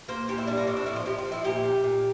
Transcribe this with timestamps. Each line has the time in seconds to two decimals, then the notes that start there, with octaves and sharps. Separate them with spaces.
0.08 A#3 C5
0.28 A#2 G4
0.38 E4
0.47 G3 D4
0.57 A#3
0.67 A2 C4
0.77 D4
0.86 F3 E4
0.96 F4
1.06 F3 G4
1.18 F4
1.25 F3
1.32 E4
1.44 A#2 G4
1.64 A#2
1.84 A#2